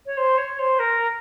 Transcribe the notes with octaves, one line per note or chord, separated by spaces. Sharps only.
C#5
C5
C#5
C5
A#4